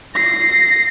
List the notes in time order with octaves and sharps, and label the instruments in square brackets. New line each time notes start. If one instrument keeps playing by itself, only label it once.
[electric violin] A#6 C7